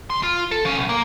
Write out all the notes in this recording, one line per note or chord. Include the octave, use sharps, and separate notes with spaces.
C#3 C6
F4
A4
F3 C#4
B1
A#3